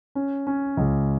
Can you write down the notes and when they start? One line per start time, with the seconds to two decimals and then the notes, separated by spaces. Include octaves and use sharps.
0.15 C#4
0.47 C#4
0.77 C#2